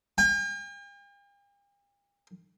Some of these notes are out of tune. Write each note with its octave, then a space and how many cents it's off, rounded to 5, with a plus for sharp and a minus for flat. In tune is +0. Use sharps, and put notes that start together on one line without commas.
G5 +45